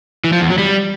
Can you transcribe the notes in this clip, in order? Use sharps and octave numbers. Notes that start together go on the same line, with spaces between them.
E3
F3
E2
F#3
G3